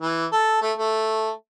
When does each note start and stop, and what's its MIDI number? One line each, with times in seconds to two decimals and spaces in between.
0.01 0.26 52
0.32 0.59 69
0.61 0.73 57
0.78 1.30 57